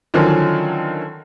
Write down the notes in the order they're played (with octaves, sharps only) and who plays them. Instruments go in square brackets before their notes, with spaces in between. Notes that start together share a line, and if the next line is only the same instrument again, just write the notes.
[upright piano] D3 D#3 F3 F#3 C#4